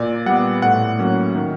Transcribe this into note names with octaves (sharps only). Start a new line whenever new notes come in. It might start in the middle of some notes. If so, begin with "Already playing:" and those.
Already playing: A#2 D5
G3 B3 F#5
A2 F#5
F#3 A#3 C#4
D#3